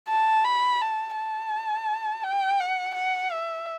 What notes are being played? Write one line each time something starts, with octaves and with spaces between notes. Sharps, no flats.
A5
B5
A5
A5
G5
F#5
F#5
E5